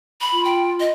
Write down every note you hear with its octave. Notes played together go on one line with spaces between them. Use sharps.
B5
F4
G5
D#5